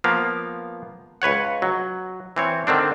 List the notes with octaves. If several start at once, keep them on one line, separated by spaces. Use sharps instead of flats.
F3 A#3 B3 F5
C#2 B4 C#5 F#5
F#3
E3 C4 C#5
D3 D#3 C4 D4